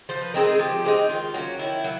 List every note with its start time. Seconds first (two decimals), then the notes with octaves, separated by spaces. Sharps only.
0.09 F3 C5
0.22 B4
0.34 G#3 C4 D#4 A#4
0.47 G#4
0.59 F3 G4
0.85 G#3 C4 D#4
1.09 D#3 F4
1.34 F#3 A#3 C#4
1.59 D#3 E4
1.84 F#3 A#3